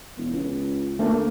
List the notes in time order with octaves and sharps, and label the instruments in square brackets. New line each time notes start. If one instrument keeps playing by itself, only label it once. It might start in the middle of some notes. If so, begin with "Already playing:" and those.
[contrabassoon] E1
C#2
[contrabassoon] D2 [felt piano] A3 A#3 A5